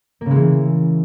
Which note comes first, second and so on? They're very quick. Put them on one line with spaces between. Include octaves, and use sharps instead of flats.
A#3 C#3 G#3 E3